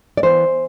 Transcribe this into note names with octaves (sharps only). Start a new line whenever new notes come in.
D5
E3 B3 C5